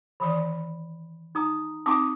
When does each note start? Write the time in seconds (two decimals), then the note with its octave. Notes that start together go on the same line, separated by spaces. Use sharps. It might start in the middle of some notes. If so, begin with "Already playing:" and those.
0.20 D#3 E3 D5 B5
1.35 D#4 A#5 D#6
1.86 C4 D#4 G#5 D6 D#6